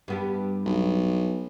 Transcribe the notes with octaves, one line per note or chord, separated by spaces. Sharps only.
G2 B3 G4
B1